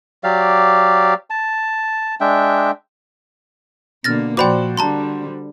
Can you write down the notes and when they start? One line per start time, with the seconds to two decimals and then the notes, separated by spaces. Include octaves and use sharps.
0.24 F#3 G4 D5 F5
1.30 A5
2.21 G#3 D4 E5 G5
4.04 B2 D3 A#3 F6 A6 A#6
4.37 A#2 F3 F#4 C5 D5 G5 B5 D6
4.77 D3 G3 A5 A#5 C6